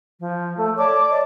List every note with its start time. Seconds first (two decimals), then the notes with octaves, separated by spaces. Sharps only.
0.20 F3
0.57 A3
0.78 C#5 D5 A5 D6
1.11 D5 D#5